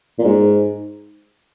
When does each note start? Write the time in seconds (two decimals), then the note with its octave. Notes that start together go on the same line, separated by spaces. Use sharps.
0.19 A#2
0.24 G#2